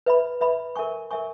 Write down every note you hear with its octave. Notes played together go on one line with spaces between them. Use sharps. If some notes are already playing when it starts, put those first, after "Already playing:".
B4 E5 B5
B4 E5 B5
A#4 E5 G#5 C#6
A#4 E5 G#5 C#6